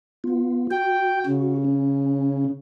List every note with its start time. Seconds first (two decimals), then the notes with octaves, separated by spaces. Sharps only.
0.24 B3 F4
0.71 F#4 G5
1.26 C#3
1.64 C#4